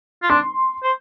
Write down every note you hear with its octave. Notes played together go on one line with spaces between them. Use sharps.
F4
D4 C6
C5